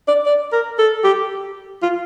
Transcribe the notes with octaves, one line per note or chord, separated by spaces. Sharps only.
D5
D5
A#4
A4
G4
F4